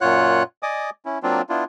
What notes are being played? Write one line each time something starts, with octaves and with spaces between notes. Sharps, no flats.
F#2 A#2 F4 C#5 F#5 F#6
D5 D#5 G#5 D6 D#6
C#4 E4
F#3 A#3 C4 D4 F4
B3 D4 E4 F4